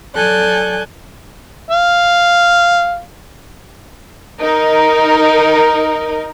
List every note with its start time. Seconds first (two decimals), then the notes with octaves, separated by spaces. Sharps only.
0.16 F#3 A4 D5 G#5 F#6 G6
1.71 F5
4.41 D#4 A#4